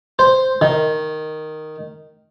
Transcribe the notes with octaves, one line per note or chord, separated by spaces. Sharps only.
C5
D#3